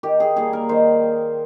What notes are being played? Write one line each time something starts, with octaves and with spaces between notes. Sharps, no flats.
D#3 G4
G#4
G3 A#3 G#4
A#4
D#3 C5